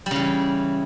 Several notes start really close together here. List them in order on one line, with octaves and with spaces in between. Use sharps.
G3 C#3 E3